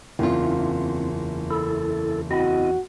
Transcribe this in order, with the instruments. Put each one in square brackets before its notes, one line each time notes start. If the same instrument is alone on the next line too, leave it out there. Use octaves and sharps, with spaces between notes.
[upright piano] F#1 [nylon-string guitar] E2 F4 [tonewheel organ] C4
[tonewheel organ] E4 A4
[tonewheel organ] C4 E4 D#5 [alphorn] F#4